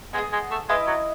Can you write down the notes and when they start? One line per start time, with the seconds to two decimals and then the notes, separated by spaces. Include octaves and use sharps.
0.13 G#3 B3 D#4 G#4
0.32 G#3
0.51 A3
0.69 G#3 E4 B4 D#5
0.87 F#3